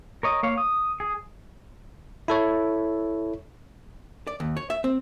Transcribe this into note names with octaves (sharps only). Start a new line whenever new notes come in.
A#4 C#5 D#5
A#3 C#5 F5
D#6
G#4
E4 A4 C#5
D5
D#2
C#5
E5
C4